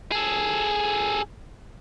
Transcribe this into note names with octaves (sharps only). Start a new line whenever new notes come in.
G#4 A4